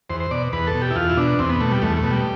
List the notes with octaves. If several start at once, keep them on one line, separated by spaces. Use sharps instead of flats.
E2 C5
C5
B2 D5
E2 B4
A4
B2
G4
E4
E2 F4
E4
B2 D4
E2 C4
B3
B2 A3
G3
E2 A3
A3
B2
G3